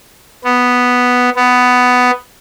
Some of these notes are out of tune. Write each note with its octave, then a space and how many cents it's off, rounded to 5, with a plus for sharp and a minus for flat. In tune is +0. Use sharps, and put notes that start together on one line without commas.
B3 +0
B3 +10